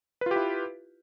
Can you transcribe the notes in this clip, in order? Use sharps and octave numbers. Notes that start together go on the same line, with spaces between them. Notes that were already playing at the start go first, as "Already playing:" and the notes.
E4 F4 G4 B4